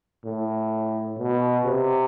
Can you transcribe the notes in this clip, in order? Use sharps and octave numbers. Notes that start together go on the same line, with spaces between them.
A2
B2
C3